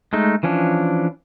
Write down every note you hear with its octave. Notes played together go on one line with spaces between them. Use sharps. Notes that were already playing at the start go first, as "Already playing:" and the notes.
G#3 A3 D#4
E3 F3 C#4 D4